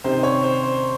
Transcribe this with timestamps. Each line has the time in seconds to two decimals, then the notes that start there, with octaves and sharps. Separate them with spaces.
0.04 C3 D#3 C5
0.23 C#5
0.43 C5
0.63 C5